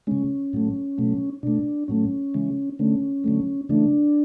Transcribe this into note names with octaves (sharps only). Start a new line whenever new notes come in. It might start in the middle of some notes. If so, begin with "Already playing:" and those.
C#3 G#3 C#4
A2 F#3 A3
B2 F#3 A3
B2 A3 D4
A2 F#3 A3 C#4
C#3 E3 G#3
D3 A3 C#4
D3 F#3 A3
C#3 E3 A3 D4